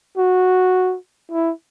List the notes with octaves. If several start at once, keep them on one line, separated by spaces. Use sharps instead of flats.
F#4
E4